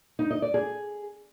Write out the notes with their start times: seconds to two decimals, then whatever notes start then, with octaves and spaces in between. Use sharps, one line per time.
0.19 D#4
0.31 D#5
0.42 D5
0.54 G#4